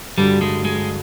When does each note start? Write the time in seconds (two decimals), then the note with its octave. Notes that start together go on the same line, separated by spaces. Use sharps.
0.18 G2 D3 F#3 G3
0.41 G#3
0.65 G#3